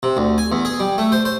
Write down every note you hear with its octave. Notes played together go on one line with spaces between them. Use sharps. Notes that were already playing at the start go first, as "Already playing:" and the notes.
C3
D2
G#5
E2
G#4
G3
A3
C5
C5